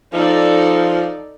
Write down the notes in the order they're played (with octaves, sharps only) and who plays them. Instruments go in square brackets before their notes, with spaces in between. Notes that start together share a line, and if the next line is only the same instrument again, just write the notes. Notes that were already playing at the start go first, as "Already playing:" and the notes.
[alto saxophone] F3 [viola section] D#4 A4 D5